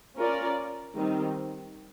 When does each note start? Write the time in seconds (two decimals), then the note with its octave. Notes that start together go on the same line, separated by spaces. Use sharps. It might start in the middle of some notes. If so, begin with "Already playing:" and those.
0.16 C#4 F4 A#4 D5
0.96 D#3 G3 C4 D#4